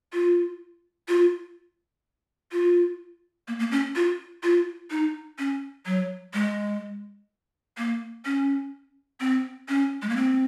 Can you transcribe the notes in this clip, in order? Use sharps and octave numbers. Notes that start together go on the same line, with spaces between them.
F4
F4
F4
A#3
A#3
C#4
F4
F4
D#4
C#4
F#3
G#3
A#3
C#4
C4
C#4
G#3
A#3
C4